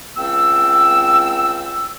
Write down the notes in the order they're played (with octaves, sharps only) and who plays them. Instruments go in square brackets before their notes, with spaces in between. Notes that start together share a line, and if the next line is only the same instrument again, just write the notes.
[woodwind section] C#2 C4 E6